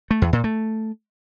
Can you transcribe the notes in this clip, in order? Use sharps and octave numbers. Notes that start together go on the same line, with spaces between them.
A3
E2
A#2
A3